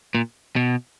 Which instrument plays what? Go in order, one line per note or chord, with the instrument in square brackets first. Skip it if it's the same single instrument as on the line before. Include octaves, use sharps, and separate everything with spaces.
[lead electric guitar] A#2
B2